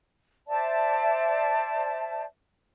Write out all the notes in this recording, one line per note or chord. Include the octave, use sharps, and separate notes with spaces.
C5 D5 E5 A5